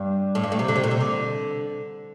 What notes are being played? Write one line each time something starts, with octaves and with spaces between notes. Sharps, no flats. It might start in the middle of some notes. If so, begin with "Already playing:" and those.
Already playing: G2
A2
G2
A2
C3
D3
C3
A#2
C3
D3